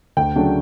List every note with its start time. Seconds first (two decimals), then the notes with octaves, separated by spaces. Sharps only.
0.17 D2 G5
0.36 C#3 F#3 A3 D4